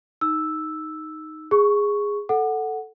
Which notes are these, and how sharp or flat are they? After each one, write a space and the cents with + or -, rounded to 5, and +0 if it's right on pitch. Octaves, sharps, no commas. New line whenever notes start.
D#4 +0 E6 +0
G#4 -10 C#6 +0
A4 +0 F#5 +0